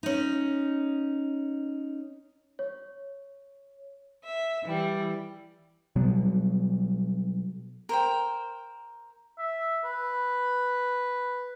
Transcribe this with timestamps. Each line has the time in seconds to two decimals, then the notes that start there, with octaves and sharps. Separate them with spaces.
0.03 C#4 D#4
2.59 C#5
4.24 E5
4.64 E3 G3
5.96 B2 F#3 G3 B3
7.89 A#4 C5 G5
9.39 E5
9.84 B4